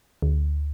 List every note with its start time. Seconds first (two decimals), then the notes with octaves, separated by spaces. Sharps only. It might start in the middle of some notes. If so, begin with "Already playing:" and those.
0.22 D2